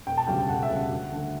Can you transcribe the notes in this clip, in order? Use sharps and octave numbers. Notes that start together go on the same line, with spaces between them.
E1 G5
A5
D2 C#3 G3 G5
G5
E1 F#5
E5
D2 C#3 G3
F#5
D2
D3 A3